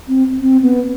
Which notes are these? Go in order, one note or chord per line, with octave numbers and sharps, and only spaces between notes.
C4
C4
B3